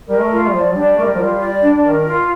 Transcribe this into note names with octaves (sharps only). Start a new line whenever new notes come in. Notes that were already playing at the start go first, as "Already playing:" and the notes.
G3 A#4
A3
F4
G3
F3 D5
G3 D4
A3 A#4
G3
F3
G3 F4
D5
D4
D#3 A#4
F4